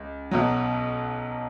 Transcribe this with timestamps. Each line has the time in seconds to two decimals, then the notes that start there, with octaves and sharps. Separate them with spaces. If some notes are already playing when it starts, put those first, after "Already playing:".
Already playing: C#2
0.31 B1 B2 F#3